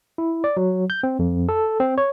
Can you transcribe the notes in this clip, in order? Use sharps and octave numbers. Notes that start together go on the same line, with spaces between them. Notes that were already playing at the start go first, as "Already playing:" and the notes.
E4
D5
F#3
G6
C4
F2
A4
C4
C#5